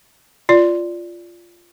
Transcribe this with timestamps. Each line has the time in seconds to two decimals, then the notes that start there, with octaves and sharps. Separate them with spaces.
0.49 F4 D5